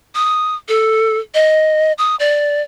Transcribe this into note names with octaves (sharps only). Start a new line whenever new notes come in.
D#6
A4
D#5
D#6
D5